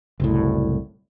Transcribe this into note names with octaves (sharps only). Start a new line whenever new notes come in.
F#1 C2 A2